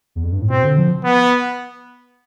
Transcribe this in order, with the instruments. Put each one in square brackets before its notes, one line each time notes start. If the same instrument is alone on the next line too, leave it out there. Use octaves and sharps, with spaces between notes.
[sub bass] E2
F2
G2
A2
[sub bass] B2 [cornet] C4
[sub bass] D3
F3
[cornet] B3